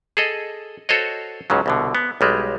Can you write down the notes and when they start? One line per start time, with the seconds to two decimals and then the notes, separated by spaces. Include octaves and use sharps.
0.17 G#4 A4 D#5
0.89 F#4 A4 C5 C#5 D#5
1.50 C#2 G#2 C#3 F#3
1.66 C2 B2 D3
1.95 B3
2.21 B1 G3 G#3